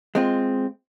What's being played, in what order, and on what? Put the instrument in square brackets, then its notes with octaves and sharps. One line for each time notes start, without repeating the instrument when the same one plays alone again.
[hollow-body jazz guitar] G#3 C4 F4